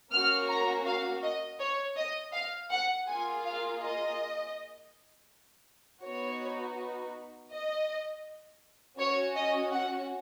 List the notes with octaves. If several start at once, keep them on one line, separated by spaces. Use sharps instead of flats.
A#3 C#4 F#4 F6
A#5
F5
D#5
C#5
D#5
F5
F#5
A#3 F4 G#4 G#5
F5
D#5
B3 D#4 F#4 C#5
D#5
C#4 F#4 C#5
D#5
F#5